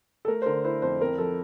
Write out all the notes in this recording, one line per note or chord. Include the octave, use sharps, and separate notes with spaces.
A4
A3 A#4
C5
D3 A#4
E4 C5
F2 C5
C4 A#4
F3 A4